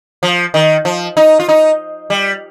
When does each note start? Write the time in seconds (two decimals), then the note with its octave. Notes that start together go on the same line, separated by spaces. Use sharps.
0.23 F3
0.54 D#3
0.85 F3
1.17 D#4
1.40 F4
1.49 D#4
2.10 G3